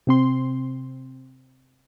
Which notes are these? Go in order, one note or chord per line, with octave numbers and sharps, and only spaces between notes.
C3 C4 C6